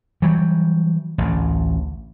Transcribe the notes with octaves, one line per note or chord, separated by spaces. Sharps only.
E3 F#3 G3
A1 D2